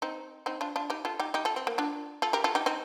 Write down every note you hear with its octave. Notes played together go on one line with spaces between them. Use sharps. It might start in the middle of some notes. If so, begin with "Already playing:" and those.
C4 D#4
C4 D#4
D4 F4
D4 F4
D#4 G4
F4 A4
D#4 G4
D#4 G4
F4 A4
C4
A#3
D4 F4
F4 A4
G4 A#4
F4 A4
D#4 G4
C4 D#4